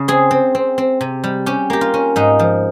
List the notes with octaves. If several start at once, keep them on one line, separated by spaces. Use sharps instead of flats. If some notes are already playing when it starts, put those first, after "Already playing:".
Already playing: C#3
C4 G#4
C4
C4
C4
C3
G3
C#4 G4
A#3 G4
F4
C#4
G#2 D#4
F3